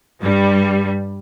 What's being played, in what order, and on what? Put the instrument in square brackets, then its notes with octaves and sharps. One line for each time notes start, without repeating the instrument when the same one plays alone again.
[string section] G2 G3